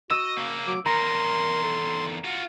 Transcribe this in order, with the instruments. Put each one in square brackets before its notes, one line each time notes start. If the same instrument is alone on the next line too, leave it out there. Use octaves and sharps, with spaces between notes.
[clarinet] F#4 [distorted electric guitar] D#5 [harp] E6
[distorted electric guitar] C#3 A#3
[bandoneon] F#3 [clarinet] D6
[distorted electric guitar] E2 D#3 [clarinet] A#4 [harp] A#5 [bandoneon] C6
[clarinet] A4
[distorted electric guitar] F4 F#4